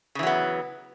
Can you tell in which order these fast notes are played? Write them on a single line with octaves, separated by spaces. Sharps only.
C#3 E3 F#3 B3